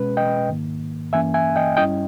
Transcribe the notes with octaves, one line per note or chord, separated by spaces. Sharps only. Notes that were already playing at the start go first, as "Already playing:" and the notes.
Already playing: B2 G#3 C#4 B4
D#5 G5
G#2 D#3 A#3
G2 E3 A#3 C#4 E5 G#5
E5 G#5
D#5 G5
G2 G3 C#4 E4 D#5 G5